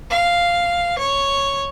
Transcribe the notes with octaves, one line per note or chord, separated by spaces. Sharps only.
F5
C#5